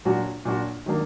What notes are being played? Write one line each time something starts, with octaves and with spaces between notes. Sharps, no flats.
A#2 F#3 D4 F#4
A#2 F#3 D4 F#4
D#3 F#3 A#3 D4